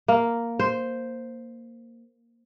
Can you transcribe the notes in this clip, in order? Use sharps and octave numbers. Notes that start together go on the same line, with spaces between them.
A#3
C5